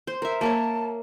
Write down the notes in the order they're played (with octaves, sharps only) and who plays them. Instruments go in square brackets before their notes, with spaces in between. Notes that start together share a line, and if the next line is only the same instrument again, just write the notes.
[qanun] C5
A#4 E5
[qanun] A#3 A#4 C#5 [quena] A5